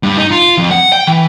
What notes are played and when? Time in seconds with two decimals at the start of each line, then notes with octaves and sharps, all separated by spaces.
0.03 G2
0.17 D#4
0.31 F4
0.58 F2
0.71 F#5
0.92 G5
1.07 E3